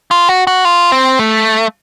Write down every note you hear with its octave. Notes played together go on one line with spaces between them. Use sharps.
F4
F#4
F#4
F4
C4
A3